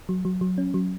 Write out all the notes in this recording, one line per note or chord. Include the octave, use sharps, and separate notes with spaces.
F#3
F#3
F#3
C#4
F#3